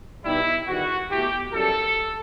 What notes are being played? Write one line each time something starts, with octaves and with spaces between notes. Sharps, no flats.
B2 G3 D#4 E4
E2 D#3 G3 B3 E4 F#4
B2 A3 E4 G4
F#2 E3 G3 A4